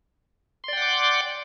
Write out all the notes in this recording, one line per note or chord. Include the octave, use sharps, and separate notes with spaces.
D5 F#5 G5 C6 D6